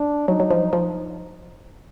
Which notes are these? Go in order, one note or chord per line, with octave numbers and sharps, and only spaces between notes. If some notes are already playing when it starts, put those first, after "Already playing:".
Already playing: D4
F#3 D#4
F#3
F3
F3